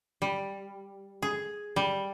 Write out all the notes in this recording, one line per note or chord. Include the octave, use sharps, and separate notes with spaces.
G3
G#4
G3